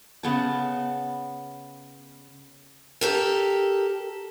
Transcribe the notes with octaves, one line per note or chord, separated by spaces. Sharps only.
C#3 B3 A5
G4 A4 A#4